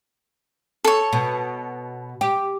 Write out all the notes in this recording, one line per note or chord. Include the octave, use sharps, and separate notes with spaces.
A4 C#5
B2
G4